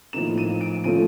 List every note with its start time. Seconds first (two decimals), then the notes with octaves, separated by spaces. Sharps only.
0.13 A2 F3 A#3 D#4 E7
0.38 D#7
0.61 D7
0.84 F3 A3 C#4 F4 D#7